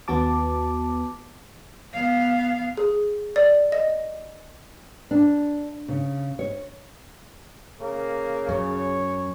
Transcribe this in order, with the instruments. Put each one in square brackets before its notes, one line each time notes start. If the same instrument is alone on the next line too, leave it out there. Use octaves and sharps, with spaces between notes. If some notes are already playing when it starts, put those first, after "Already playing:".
[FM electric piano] D#2 B3 F#4 A5 D6
[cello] B3 F5
[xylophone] G#4
D5
D#5
[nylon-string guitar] D4
C#3
C#5
[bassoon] C#3 [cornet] A#3
[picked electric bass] F#2 [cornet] C#5